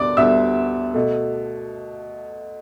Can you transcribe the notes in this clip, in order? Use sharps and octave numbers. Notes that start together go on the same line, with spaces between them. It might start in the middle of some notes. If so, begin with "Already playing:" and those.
Already playing: D2 D3 G3 B3 D5 D6
D2 D3 G3 B3 E5 E6
B2 A3